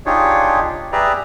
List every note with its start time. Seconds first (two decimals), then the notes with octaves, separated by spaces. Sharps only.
0.06 D4 D#4 F4 G4 G#4 C#5
0.92 G4 G#4 B4 D5 E5 A#5